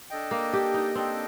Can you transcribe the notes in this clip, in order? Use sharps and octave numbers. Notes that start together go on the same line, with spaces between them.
D4 A4 D#5 G5
A#3
G4
D#4
C4 D4 A4 D#5 G5